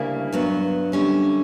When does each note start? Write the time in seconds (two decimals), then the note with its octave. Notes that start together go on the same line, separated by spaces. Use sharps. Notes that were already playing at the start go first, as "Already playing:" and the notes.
Already playing: D2 C#3 G3 A#3 E4
0.32 G2 F#3 B3
0.92 F#2 D3 G3 C#4